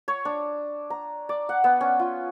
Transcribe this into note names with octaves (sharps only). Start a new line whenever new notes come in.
C#5
D4
A#5
D5
F#5
B3
C#4
F4